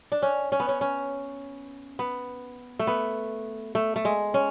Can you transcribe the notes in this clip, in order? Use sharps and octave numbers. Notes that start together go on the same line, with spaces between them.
D4
C#4
C#4
B3
C#4
C#4
B3
A3
B3
A3
A3
G#3
C#4